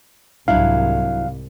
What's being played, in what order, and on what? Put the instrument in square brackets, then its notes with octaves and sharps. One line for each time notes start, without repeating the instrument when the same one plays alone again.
[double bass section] C2 G#2 [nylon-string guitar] F#3 D4 E4 [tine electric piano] F5